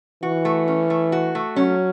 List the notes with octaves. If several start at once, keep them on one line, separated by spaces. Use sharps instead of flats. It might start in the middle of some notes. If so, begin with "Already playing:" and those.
E3 F#4
A3
C#4
A3
F#4
A3
F#3 C#4